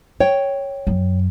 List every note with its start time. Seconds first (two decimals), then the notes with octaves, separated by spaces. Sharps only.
0.20 C#5 G5
0.87 F#2